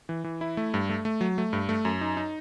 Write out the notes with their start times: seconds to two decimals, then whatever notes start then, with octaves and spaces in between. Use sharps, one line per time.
0.09 E3
0.24 E3
0.41 E4
0.57 A3
0.74 G2
0.89 A3
1.05 A3
1.21 F#3
1.38 A3
1.53 G2
1.69 A3
1.85 F#2
2.01 D#4
2.17 D#4